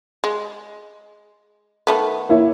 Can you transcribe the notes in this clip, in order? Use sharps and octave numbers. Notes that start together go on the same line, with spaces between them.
G#3
D#3 A3 B3
A#3 E4 C#5